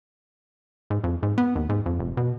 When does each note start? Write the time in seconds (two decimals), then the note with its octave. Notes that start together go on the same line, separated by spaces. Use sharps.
0.90 G#2
1.04 F2
1.23 G#2
1.38 B3
1.55 D#2
1.69 G#2
1.86 F2
1.99 F1
2.17 B2